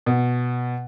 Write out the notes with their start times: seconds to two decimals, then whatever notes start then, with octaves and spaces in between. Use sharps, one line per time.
0.06 B2